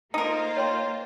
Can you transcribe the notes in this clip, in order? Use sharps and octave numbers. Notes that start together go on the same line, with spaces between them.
A#3 D#4 F4 A4 A#4 C5 A5
C#5 G5 C6